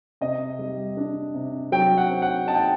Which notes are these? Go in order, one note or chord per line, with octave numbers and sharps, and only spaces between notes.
C3 D#5
G3
D4
C3
F#3 G5
F#5
C4
F#5
D#4 A5
G5